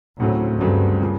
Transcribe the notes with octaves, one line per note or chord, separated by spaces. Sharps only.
D2 A2 C#3 F#3 A3 C4
D2 G2 C#3 F#3 A3 C4
C#3 F3 A#3